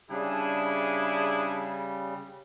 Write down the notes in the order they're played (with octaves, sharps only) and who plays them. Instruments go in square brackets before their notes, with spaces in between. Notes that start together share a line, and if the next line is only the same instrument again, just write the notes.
[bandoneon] C#3 G3 [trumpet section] D4 E4 G#4